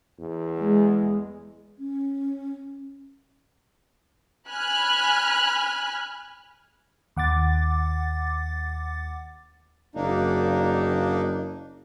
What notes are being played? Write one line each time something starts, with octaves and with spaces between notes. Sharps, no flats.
E2
G#3
C#4
G#5 B5 F6 F#6
D#2 F#5 D6 A6
F#1 A#3 D4 D#4